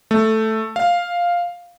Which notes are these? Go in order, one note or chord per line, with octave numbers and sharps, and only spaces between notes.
A3
F5